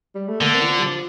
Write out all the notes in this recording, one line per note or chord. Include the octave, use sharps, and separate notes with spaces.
G3
A3
D3 A#3
C4
E3
F3
G3
F3